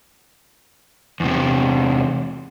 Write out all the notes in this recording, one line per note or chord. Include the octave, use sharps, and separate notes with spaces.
E2 C3